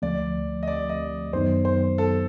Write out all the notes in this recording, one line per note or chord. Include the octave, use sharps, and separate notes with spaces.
D2 D3 F3 A3 D5
D#5
D5
D#5
F#2 D#3 F#3 B3 D#4 C5
C5
A4